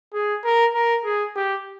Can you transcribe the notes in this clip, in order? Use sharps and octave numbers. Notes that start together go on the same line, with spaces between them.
G#4
A#4
A#4
G#4
G4